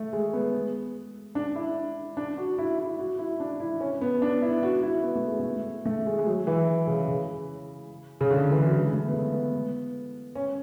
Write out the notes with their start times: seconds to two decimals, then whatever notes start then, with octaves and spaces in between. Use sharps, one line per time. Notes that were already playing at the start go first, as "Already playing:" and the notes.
Already playing: A3
0.13 G#3
0.33 B3
1.35 D4
1.56 E4
2.17 D4
2.38 F#4
2.59 E4
2.79 E4
2.99 F#4
3.19 E4
3.40 D4
3.60 E4
3.80 C#4
4.01 B3
4.22 D4
4.42 E4
4.63 F#4
4.83 E4
5.03 B3
5.15 A3
5.28 G#3
5.40 A3
5.86 A3
6.06 G#3
6.19 G#3
6.26 F#3
6.47 E3
6.87 C#3
7.08 C#3
8.21 C#3
8.31 D3
8.52 E3
8.67 F#3
8.72 G#3
8.93 A3
9.07 B3
9.13 A3
9.33 B3
10.35 C#4